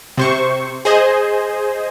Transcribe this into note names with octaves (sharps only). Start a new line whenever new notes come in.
C3 C5 C#6
G#4 C5 D#5